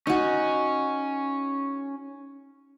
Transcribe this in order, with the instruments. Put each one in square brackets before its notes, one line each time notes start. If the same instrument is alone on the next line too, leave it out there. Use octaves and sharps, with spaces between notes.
[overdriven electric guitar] C#4 [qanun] D#4 F#4